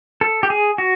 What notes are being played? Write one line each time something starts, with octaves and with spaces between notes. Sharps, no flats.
A4
G4
G#4
F#4